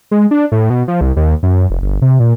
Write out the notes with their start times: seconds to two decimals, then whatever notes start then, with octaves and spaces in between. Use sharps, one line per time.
0.11 G#3
0.31 D4
0.52 A2
0.70 B2
0.88 F3
1.01 C2
1.16 D#2
1.43 F#2
1.70 F1
1.82 G1
2.02 C3
2.20 A#2